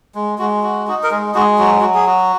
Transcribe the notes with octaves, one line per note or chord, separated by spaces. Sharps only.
G#3
G#3 F#4
F#4
D#4 F#4
A#4
G#3 G#4
G#3 F#4
F#3 F#4
F#3 F#4
G#4
F#4